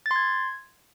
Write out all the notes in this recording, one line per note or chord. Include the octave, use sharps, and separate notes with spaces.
A6
C6
G#6